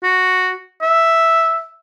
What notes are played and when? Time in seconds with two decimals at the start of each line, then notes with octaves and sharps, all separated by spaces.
0.03 F#4
0.82 E5